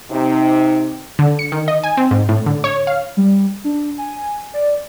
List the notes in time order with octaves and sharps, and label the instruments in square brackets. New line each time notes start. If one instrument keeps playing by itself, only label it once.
[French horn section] C3 D#4
[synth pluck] D3
C#7
D#3
D#5
G#5
C4
G#2
A2
D3
C#5
F5
[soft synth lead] G3
D4
G#5
D5